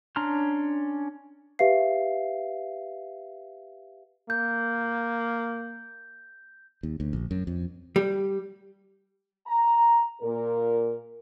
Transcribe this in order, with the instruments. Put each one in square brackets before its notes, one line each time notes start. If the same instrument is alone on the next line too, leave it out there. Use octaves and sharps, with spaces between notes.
[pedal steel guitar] C#4 D4 A#5 C6 F6
[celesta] G4 B4 E5 F5 C7
[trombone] A#3 [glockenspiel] G6
[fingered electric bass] D#2
D2
A#1
F#2
F2
[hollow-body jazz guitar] G3
[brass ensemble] A#5
A#2 A#4